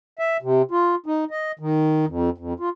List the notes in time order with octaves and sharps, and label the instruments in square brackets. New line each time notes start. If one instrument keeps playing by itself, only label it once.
[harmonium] E5
C3
F4
D#4
D#5
D#3
F2
F2
F4